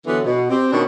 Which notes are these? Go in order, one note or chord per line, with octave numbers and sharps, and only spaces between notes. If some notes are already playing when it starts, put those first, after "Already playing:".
D3 E3 F#3 B3
B2
C4 G4
B2 D#3 C#4 D4